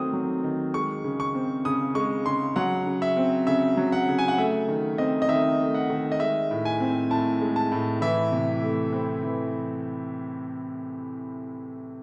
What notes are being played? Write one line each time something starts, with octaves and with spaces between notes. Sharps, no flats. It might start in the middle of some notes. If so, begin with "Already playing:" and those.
Already playing: D#3 F#3 A3 C4 D#6
F#3
D#3
G#3 C#6
C#3
C#6
C4
C#3 D#6
G#3 C#6
C#3 C6
F#3 F#5
C#3
E5
C4
C#3 E5
F#3
F#5
C#3
G#5
F#5
A3 E5
D#3
C4 D#5
D#5
D#3 E5
A3
F#5
D#3
D#5
G#3 E5
A2
G#5
C4
A2 A5
G#3
A5
A2
E3 E5
C3
A3
C4
E3